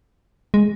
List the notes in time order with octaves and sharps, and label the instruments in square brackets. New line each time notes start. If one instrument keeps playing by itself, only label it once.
[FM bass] G#3